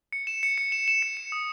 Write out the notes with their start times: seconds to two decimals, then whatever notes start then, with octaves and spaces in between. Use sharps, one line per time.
0.13 C#7
0.27 E7
0.43 C#7
0.58 C#7
0.72 E7
0.88 E7
1.02 C#7
1.17 E7
1.32 D#6